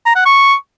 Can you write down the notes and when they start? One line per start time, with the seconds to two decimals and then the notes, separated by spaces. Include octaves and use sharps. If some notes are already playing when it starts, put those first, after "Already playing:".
0.06 A#5
0.16 F#5
0.26 C#6